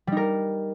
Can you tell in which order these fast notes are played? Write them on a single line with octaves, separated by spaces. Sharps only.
G3 D#4 A#4